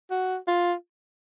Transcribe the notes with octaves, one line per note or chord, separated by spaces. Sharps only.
F#4
F4